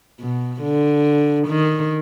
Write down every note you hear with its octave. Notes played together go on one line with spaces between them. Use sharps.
B2
D3
D#3